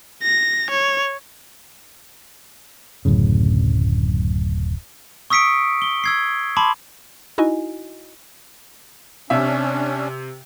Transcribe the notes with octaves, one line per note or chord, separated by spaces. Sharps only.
A#6
C#5
D1 F#2 A2 C#3
C#6 D#6 E6 B6 C#7 D7
G7
E6 G#6 C7
A5 B5 C6 D6
D#4 E4 F#4 D#5 G#5
C3 C#4 D4 E5